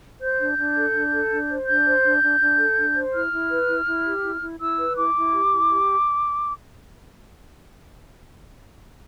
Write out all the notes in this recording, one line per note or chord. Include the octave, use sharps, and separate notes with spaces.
C5 G6
D4
D4
A4
D4
A4
D4
C5
D4 G6
C5
D4
D4
D4
A4
D4
C5
E4 F6
E4
B4
E4
E4
G4
E4
E4
E4 E6
B4
E4 D6
E4
G4
E4
G4